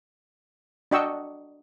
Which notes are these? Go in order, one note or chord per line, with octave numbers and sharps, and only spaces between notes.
D4 F#4 D#5 G5 C#6 E6